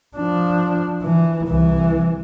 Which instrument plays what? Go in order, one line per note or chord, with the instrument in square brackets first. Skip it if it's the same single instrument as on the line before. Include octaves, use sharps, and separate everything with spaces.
[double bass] F3 D4
E3
C2 E3